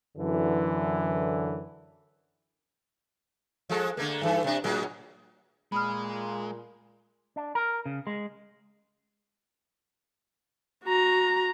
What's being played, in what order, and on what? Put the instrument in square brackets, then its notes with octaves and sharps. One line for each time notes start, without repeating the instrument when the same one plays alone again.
[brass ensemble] F#2 D3 E3
[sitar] F3 G#3 A4
D3 A3 A#3
G2 E3 A4
C3 D4
A2 F#3 G#3
[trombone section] A#2 [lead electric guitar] G#3 [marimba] B5 D#6 F6
[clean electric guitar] D4
A#4
C#3
G#3
[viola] F#4 A#5